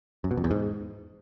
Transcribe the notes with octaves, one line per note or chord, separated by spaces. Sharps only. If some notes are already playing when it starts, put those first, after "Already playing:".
F#2
B2
F2
E2
G#2